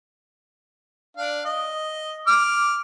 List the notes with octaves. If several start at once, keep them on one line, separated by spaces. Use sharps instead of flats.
D4 F5
D#5
D6 F6